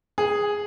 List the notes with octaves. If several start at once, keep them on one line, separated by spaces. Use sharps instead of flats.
G#4